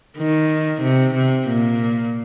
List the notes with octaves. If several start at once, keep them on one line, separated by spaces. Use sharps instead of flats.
D#3
C3
C3
A#2